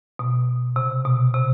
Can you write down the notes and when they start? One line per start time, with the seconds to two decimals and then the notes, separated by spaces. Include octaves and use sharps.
0.19 B2
0.76 C3
1.05 B2
1.34 C3